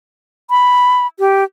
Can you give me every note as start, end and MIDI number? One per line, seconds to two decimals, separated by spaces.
0.50 1.07 83
1.19 1.44 67